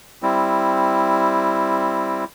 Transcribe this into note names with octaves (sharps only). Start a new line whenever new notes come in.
G3 C4 E4